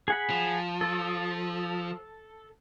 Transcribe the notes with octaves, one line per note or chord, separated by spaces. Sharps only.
G#4 F#5 B5
F3
A4